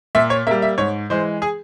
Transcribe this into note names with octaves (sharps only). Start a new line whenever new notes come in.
A#2 E5
C#5
G3 A#3 E5
E5
G#2 C#5
E3 G#3 C5
G#4